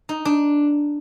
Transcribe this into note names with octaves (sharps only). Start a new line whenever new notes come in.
D#4
D4